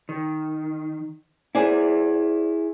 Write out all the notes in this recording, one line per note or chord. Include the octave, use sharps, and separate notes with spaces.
D#3
E4 G#4 C5 D5 G#5